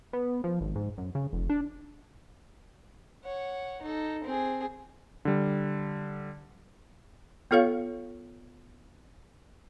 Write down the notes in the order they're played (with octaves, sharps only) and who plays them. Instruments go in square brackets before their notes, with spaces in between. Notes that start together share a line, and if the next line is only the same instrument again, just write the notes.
[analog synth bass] B3
F3
G#1
G#2
F#2
C#3
F1
D4
[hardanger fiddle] C#5 F#5
D#4 A4
C4 G#4
[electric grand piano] D3 G3
[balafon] B3 F4 A4 C#5 F5